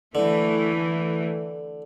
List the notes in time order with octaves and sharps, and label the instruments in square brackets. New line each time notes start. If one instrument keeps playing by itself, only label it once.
[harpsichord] D3 [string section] E3 A3